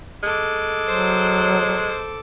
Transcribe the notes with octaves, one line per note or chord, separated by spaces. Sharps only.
G#3 A4 D6
F#3 C5